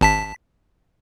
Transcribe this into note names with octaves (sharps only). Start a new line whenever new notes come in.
G#1 A5 B6